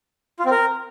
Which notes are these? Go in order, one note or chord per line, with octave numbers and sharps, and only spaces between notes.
F4
C4
A#4